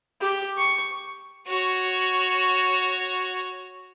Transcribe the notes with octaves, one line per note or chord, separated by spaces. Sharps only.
G4
C#6
F#4 C#5